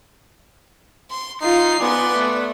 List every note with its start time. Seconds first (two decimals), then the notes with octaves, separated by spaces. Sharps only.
1.11 C6
1.42 D#4 F4 C7
1.80 B3 B4 D5 G#5 C6
2.15 A3